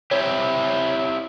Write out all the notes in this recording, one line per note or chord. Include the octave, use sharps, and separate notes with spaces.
C4 E4 G4 C#5